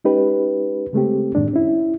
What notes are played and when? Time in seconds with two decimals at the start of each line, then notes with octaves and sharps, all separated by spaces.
0.05 G#3 C#4 D#4 G4 B4
0.93 C#3 G#3 A3 C4 G4
1.35 F#2 A2 D#3 G#3 D4
1.53 C#4 E4